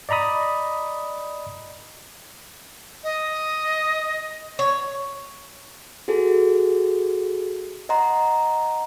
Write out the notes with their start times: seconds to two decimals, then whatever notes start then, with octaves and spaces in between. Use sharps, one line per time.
0.09 D5 D#5 A#5 B5 D#6
3.04 D#5
4.59 C#5
6.08 F#4 G#4 A4
7.89 D#5 F#5 A#5 C6